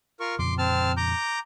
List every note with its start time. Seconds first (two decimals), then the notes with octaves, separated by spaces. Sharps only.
0.20 F4 A#4 C#6
0.39 F2 A#2 C#3 C6 D6
0.58 C4 A5 F6
0.97 A#5 D6 G6